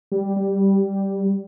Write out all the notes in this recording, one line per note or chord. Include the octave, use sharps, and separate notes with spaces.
G3
G3